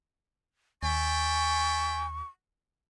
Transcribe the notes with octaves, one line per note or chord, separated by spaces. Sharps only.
D#2 D5 E5 G5 G#5 C#6